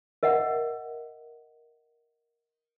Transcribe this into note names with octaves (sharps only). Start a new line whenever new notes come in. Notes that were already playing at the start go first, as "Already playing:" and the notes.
A#4 D#5 E5 F#5